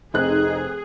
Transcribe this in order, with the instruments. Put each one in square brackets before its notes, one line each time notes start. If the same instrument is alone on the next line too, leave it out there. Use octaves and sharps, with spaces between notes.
[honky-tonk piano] F1 C4 F#6 [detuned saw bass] D#4 [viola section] G#4